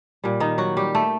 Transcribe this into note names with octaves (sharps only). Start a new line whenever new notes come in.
A#2 G3
D#3 D#4
F#3 F#4
G3 G4
A3 A4